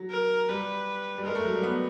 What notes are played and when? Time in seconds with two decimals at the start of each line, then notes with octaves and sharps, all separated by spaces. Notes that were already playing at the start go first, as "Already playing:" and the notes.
Already playing: F#3
0.11 A#4
0.48 G3 B4
1.18 G3
1.25 G#3 A#4
1.35 A3
1.45 F#3
1.54 G3
1.63 B3